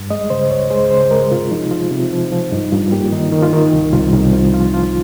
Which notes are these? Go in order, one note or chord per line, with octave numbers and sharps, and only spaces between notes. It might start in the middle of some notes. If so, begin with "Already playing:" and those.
Already playing: G2
G#3 D#5
C#3 C5
C#2 C#5
G#3 C5
C#3 C5
G#3 A#4
C3 F4
F3 D#4
F3 F4
C3
F3
F3
G2 D#4
G2 F4
A#3 G4
D#3 D#4
D#3
F4
D#3
C2
C2 F4
C2 D#4
C3 F4
F3 F4
F3 F4